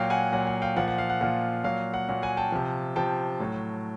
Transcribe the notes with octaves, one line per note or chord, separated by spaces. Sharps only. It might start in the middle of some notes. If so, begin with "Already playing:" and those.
Already playing: A#2 F#3 F5 G5
F#5 G#5
A#2 F#3 F#5
F#5
F5 G5
A#2 F3 F#5
F#5
F5
F#5
A#2 F3 F#5
A#2 F#3 F5
F#5
A#2 F#3 F#5
F#5 G#5
G5 A5
C3 F3
C3 F3 G5 A5
A2 F#3